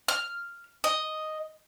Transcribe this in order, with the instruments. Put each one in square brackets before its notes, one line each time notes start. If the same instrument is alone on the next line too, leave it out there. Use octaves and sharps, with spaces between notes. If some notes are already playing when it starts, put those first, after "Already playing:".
[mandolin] F6
D#5